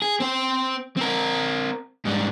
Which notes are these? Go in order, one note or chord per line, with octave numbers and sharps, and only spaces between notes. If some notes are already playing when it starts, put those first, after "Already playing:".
G#4
C4 C5
C4 A#4
G#2 G3